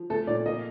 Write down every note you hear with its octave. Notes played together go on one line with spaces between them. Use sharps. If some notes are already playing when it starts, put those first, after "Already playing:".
Already playing: F3
A3 A4
A#2 D5
A#3 D#5